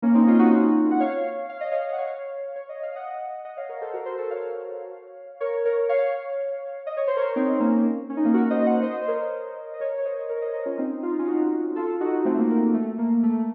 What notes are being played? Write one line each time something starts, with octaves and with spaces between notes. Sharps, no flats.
A#3 C#4
C4 D#4
C#4 F4
D#4 F#4
F#5
C#5 F5
F5
D#5
C#5 F5
F#5
C#5 F5
C#5
D#5
F5
D#5 F#5
D#5 F#5
C#5 F5
A#4 C#5
A4 C5
F#4 A#4
A4 C5
A4 C5
C#5 F5
A#4 C#5
A#4 C#5
C#5 F5
D#5
C#5
C5
A#4 C#5
C4 D#4
A#3 C#4
C#4
D#4
A#3 C#4
F#4 A#4
C5 D#5
D#5 F#5
C5 D#5
C5
A#4 C#5
D#5
A#4 C#5
C#5
C5 D#5
A#4 C#5
C5 D#5
A#4 C#5
C#4 F4
C4 D#4
F4
D#4
C#4 F4
D#4 F#4
F4 A4
D#4 F#4
A3 C4
A#3
A#3
A3
A#3
A3